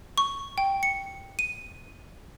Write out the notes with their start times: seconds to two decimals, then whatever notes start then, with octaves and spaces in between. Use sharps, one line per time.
0.18 C#6
0.58 G5
0.83 C#7
1.39 D#7